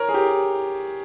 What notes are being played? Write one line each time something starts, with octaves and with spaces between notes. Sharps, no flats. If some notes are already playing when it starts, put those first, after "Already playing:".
Already playing: A#4 C#5
G#4
G4